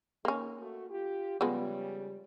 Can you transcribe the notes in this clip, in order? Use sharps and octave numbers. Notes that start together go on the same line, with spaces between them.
D#3 A#3 C#4
A3 F#4
F4 G4
C#3 F3 G3 G#3 B3